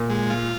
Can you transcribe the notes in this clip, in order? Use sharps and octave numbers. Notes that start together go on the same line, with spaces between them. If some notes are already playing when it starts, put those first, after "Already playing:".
Already playing: A#2
G#3
F4